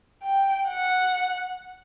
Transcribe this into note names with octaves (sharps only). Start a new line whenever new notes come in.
G5
F#5